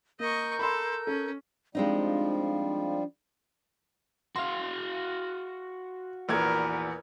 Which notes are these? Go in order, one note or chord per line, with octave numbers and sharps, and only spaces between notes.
A#3 A#4 D#5 C#6 E6 G6
A4 B5 C6
C#4 A4
F3 G3 G#3 C4 D4 D#4
F#4 F5 C6
A#1 E2 A#4 B4 G#6